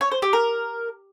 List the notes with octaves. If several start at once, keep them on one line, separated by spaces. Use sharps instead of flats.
C#5
C5
G4
A#4